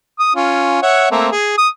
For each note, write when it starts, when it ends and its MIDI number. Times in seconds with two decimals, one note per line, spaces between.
0.19 0.33 87
0.35 0.80 61
0.35 0.80 65
0.83 1.10 73
0.83 1.10 76
0.83 1.10 78
1.11 1.29 57
1.11 1.29 58
1.11 1.29 60
1.32 1.57 68
1.58 1.68 87